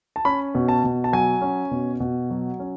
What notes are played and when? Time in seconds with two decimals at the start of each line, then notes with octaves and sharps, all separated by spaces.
0.16 A5
0.25 C#4 B5
0.55 B2
0.69 A5
0.84 B2
1.04 A5
1.13 F#3 G#5
1.42 C#4
1.71 B2
2.00 B2
2.30 F#3
2.60 C#4